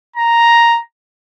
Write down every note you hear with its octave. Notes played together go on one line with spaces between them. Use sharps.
A#5